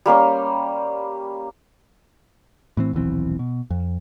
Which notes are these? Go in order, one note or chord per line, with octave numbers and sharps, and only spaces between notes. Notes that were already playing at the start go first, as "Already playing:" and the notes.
G3 A#3 C#4 C6
A2 E3 C4
D#1 B1 E3 C4
B2
F2